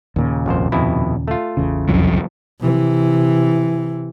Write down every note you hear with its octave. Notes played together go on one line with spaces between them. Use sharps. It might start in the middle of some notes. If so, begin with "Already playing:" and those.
D#2 A#2 C#3
G#1 F2 C5
F2 B2 E4
A3 F4
A1 E2 C#3
C2 F2 F#3
C3 E3